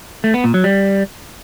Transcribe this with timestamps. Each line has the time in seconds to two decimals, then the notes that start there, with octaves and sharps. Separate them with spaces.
0.24 A3
0.34 B3
0.44 A#2
0.54 F#3
0.64 G3